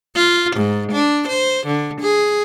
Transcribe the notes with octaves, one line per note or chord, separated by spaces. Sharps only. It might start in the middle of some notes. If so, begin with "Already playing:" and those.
F4
G#2
D4
C5
D3
G#4